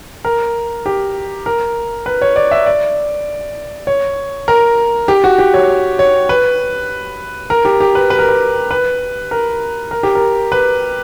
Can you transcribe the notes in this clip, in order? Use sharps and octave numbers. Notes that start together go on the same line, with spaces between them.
A#4
G4
A#4
B4
C#5
D5
E5
D5
C#5
A#4
G4
F#4
G4
C#5
C#5
B4
A#4
G4
G4
B4
B4
A#4
B4
B4
A#4
A#4
G4
A#4
B4